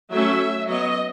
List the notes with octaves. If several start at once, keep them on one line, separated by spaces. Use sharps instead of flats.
F#3 A3 C#4 E5
F#3 B3 D#5